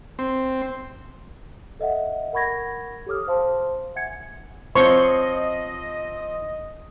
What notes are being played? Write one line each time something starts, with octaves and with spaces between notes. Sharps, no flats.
C4
A4 D#5 E5 F#5
A#4 F#5 B5 C#6 G#6 A#6
G4 A4 C#5 D6 D#6 F6
C5 F5 A5 C6
E5 F#5 G#5 G#6 C#7
F3 C4 C5 C#5 D#5 C6 C#6